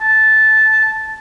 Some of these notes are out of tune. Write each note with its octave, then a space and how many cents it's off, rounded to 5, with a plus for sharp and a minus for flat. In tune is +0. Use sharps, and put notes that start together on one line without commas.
A5 -10